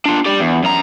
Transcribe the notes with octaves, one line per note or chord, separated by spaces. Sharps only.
D4 F4
G4 D5
E2
F#2 A#5